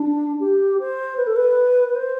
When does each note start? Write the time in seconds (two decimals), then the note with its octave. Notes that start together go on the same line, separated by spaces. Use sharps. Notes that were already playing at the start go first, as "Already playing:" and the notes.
Already playing: D4
0.40 G4
0.80 C5
1.17 B4
1.27 A4
1.36 B4
1.88 B4
1.95 C5